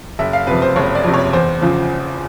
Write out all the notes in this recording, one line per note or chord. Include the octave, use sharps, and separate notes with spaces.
F#1 E5
F5
F2 C3 B4
C5
F#1 C#5
D5
F2 C3
C#5
E2 C5
C#3 F3